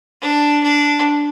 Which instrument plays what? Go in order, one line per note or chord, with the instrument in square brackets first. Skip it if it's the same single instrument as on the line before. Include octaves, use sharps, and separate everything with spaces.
[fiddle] D4
D4